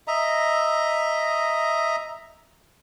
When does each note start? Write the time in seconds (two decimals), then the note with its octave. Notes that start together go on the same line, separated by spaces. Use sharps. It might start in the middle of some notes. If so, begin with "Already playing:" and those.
0.08 D#5 E5 A#5